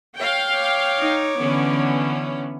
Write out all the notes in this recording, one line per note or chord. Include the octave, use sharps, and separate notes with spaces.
C#5 F5 G5
C#5 D6
D#4
D3 E3 B3 C#4